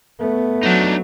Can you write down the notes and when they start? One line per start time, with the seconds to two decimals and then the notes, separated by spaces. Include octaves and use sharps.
0.20 A3 B3
0.63 F#3 D4 D#4